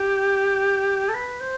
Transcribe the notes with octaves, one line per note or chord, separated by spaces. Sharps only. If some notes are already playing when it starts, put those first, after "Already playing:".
Already playing: G4
A4
B4
C5